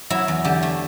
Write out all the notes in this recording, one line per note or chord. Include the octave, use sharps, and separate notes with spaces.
F#3 E4
E2
D3 G4
A3